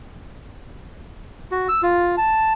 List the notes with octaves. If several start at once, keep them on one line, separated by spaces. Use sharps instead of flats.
F#4
E6
F4
A5